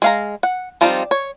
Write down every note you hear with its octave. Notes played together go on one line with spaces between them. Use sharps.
G#3 F5 A#5
F#5
F3 G3 C4 D#4 F4
C#5